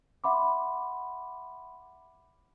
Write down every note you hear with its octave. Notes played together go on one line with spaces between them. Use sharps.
E5 F#5 B5 C6 D6